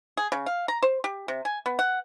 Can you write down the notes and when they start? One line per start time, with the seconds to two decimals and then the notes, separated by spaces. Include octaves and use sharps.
0.17 G#4
0.32 C#3
0.46 F5
0.68 A#5
0.82 C5
1.04 G4
1.28 C3
1.45 G#5
1.66 B3
1.79 F#5